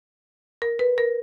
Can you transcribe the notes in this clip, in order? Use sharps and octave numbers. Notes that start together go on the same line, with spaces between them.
A#4
B4
A#4